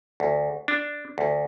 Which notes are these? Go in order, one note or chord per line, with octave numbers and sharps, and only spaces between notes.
D2
D4
D2